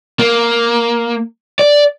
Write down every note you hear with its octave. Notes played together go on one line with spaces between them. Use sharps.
A#3
D5